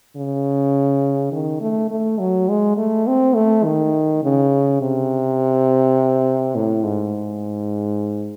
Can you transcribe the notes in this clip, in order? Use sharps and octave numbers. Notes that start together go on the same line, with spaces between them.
C#3
D#3
A3
A3
F#3
G#3
A3
C4
A3
D#3
C#3
C3
A2
G#2